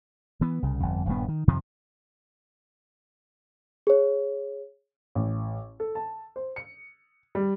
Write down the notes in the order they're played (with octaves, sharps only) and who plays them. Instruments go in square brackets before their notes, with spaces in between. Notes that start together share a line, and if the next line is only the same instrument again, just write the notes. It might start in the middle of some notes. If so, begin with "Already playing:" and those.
[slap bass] E3 B3
C2 C#3
G1 F2
D#1 G2 B3
D#3
F2 C3 D#3 F3
[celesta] G#4 C#5
[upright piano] A1
A4
A5
C5
C#7
G3